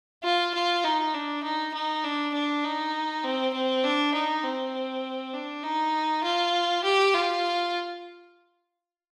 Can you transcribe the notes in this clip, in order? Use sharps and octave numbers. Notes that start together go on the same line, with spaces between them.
F4
F4
D#4
D4
D#4
D#4
D4
D4
D#4
C4
C4
D4
D#4
C4
D4
D#4
F4
G4
F4